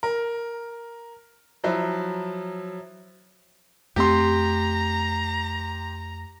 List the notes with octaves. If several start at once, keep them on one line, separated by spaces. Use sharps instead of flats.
A#4
F3 F#3 E4
F2 A3 C4 G4 A#5 C6